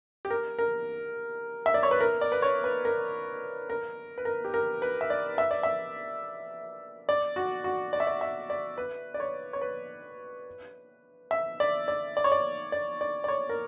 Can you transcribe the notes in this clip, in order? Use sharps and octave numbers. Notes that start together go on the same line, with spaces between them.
G4
A#4
A#4
E5
D5
C#5
B4
A#4
D5
B4
C#5
B4
A#4
A#4
B4
A#4
G4
A#4
B4
E5
D5
E5
D5
E5
D5
F#4
F#4
D5
E5
D5
E5
D5
B4
D5
C#5
C#5
B4
E5
D5
D5
D5
C#5
D5
D5
D5
D5
C#5
A#4